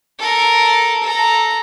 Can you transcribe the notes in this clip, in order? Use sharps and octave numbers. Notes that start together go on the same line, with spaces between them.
A4 A#4
A4 A#5